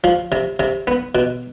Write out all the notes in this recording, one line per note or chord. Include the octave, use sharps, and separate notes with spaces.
F3
C3
C3
B3
B2